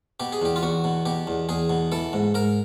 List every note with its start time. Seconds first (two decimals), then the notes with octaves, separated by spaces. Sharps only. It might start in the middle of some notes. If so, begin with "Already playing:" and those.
0.20 B2 G4
0.32 G#4
0.42 E2 G4
0.56 F4
0.63 E2 F#4
0.84 B2
1.06 B2 G4
1.27 E2
1.49 E2 G#4
1.70 B2
1.92 E3 A4
2.13 G#2
2.34 G#2 A#4